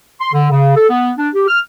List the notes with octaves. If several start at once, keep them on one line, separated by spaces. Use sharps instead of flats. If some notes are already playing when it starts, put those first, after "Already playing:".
C6
D3
C#3
A4
B3
D4
G4
F6